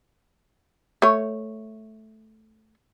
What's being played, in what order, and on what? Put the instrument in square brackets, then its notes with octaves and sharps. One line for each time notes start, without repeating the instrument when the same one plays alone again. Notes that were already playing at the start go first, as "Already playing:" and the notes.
[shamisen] A3 C#5